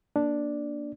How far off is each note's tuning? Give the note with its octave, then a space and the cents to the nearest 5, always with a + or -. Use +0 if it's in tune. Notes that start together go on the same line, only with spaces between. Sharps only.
A#3 +25 D4 +0 D5 +0